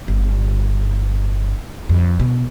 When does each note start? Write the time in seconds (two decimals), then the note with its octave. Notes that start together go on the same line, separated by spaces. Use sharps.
0.08 G1
1.89 F2
2.20 B2